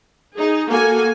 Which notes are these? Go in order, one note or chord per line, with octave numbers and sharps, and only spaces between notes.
D#4 G#4
A#3 F#4 A4 G#5